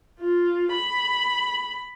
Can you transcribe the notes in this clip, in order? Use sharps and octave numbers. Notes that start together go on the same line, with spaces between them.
F4
B5